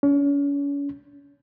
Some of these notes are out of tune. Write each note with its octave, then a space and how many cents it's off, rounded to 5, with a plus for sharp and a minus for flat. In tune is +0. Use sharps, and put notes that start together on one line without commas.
C#4 +35